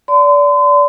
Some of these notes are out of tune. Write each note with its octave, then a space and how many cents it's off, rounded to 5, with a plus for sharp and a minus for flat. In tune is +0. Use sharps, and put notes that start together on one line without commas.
D5 -25 C6 -40